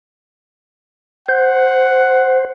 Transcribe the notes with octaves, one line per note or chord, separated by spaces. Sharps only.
C5 F#5